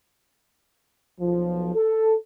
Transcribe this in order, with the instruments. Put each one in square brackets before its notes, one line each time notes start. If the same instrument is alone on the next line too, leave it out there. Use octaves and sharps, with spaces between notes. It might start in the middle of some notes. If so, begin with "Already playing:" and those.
[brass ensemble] B1 F3
A4